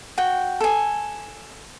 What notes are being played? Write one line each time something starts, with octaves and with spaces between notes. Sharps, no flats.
F#4 G5
A4 G#5